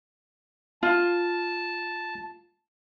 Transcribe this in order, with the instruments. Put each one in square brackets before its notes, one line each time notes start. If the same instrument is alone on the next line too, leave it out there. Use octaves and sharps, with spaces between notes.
[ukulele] F4 [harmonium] A5